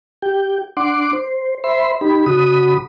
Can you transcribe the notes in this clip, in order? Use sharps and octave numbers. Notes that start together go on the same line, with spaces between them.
G4 G5
D4 F#5 C6 D6
C5
C5 E5 B5 C6
D#4 G4 B5
C#3 F#4 B5 D#6